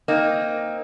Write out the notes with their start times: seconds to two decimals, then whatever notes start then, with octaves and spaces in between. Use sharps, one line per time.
0.08 A#3 C4 D#4